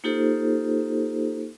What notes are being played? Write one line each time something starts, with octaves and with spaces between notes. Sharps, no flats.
A#3 D#4 F4 G4 A4 C5